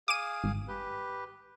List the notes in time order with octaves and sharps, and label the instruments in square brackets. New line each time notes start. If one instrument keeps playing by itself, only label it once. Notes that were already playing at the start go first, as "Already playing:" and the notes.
[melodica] G#4 F5 [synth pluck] D6 D#7
[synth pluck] G#1
[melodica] G4 B4